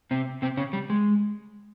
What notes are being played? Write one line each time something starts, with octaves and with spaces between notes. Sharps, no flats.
C3 C4
C3 C4
C#3 C#4
G3
G#3